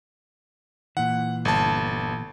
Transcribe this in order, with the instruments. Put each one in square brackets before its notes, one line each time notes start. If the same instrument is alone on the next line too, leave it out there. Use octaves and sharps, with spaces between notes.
[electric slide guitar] A#2 E3 [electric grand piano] F#5
[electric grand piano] G1 A5